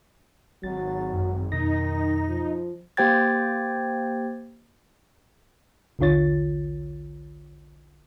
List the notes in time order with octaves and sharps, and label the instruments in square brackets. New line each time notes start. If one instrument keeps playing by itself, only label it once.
[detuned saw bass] G#1 [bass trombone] F#3 [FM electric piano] A6
[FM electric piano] F#2
[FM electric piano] F2 B2 A#6 [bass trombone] D#3 [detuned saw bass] D#4
[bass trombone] F3
[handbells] A#3 G4 C5 G5 G#6 A6
[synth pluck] A#1 D#2 D3 F4 C#5 A6